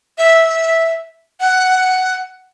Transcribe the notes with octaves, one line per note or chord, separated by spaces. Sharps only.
E5
F#5